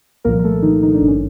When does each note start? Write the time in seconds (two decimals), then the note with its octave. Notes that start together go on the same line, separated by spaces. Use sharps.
0.25 C2 A#2 F3 A#3 A#4
0.39 A#4
0.44 A3 A4
0.62 D#3 D#4
0.83 D#4
0.94 D4
1.01 G#1 G2 D#3
1.08 C#4